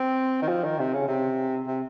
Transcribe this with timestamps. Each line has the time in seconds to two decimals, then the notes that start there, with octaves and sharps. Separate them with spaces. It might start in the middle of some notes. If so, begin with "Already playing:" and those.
Already playing: C4
0.42 D#3
0.48 F3
0.64 D#3
0.79 C3
0.94 C#3
1.08 C3
1.67 C3